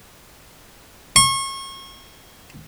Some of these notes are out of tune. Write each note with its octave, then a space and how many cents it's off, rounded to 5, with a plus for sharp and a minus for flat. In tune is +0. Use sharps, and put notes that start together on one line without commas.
C#6 -35